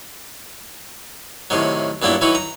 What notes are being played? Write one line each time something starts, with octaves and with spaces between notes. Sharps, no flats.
A2 C3 D#3 F#3
G2 A#2 F#3 B3 E4
E3 F#3 D#4 E4 F#4
A#5